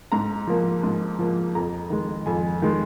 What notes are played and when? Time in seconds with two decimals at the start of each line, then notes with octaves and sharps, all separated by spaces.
0.12 G#2 A#5
0.47 F3 A#3
0.83 G#2
1.19 F3 A#3
1.55 F2 A#5
1.90 D#3 G#3
2.26 F2 G#5
2.62 D#3 G#3